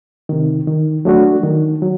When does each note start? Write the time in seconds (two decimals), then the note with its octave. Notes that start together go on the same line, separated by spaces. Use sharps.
0.29 C3 D#3
0.67 D#3
1.05 F#3 A3 D4 F#4
1.43 D#3
1.82 F#3